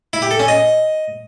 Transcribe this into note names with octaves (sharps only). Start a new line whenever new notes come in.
E4
G4
A4
C#4
D#5